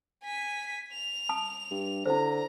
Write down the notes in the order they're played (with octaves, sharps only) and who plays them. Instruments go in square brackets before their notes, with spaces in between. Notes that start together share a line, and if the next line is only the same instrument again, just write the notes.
[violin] G#5 B6
F7
[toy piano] A5 D#6
[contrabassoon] G2
[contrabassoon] D3 [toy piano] E4 C5 [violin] A#5